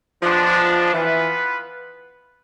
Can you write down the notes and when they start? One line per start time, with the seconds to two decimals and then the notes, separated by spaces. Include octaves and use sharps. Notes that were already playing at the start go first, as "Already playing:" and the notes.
0.22 F3 G#3 B3 D4
0.91 E3 B3 F4 B4